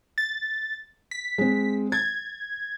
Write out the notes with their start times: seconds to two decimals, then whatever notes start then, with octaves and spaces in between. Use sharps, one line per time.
0.18 A6
1.11 B6
1.38 G#3 C4
1.92 G#6 A6